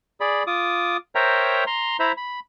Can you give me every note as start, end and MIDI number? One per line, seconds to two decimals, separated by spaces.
0.20 0.43 68
0.20 0.43 74
0.20 0.43 83
0.47 0.97 65
0.47 0.97 86
0.47 0.97 87
1.15 1.64 70
1.15 1.64 72
1.15 1.64 73
1.15 1.64 76
1.15 1.64 79
1.15 1.64 82
1.67 1.97 82
1.67 1.97 84
2.00 2.12 64
2.00 2.12 72
2.00 2.12 76
2.00 2.12 82
2.00 2.12 83
2.17 2.40 83